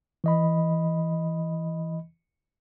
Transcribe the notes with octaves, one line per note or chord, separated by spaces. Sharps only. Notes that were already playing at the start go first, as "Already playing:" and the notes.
E3 D#5 B5